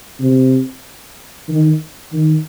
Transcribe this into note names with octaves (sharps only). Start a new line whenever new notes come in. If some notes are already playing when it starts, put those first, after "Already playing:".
C3
D#3
D#3